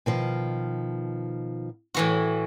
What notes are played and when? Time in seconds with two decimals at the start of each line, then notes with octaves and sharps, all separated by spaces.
0.06 B2 D#3 F3
1.94 A2 E3 F#4